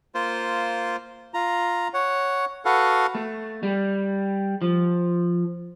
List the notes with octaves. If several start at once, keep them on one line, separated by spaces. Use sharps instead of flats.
A#3 F4 C5
F4 A#5
C#5 F#5
F#4 A4 B4 F5 F#5
A3
G3
F3